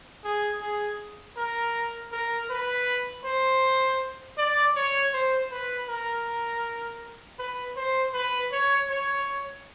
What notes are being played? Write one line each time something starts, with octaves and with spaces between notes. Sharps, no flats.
G#4
G#4
A#4
A#4
B4
C5
D5
C#5
C5
B4
A#4
B4
C5
B4
C#5
C#5